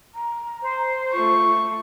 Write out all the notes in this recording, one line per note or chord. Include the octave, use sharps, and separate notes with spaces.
A#5
C5
A3 F4 C#6